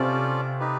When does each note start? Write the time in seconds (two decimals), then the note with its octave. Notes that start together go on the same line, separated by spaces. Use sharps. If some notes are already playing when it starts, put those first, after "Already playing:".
Already playing: C3 C4 C#4 F4 A4 D5
0.60 D#4 G4 B4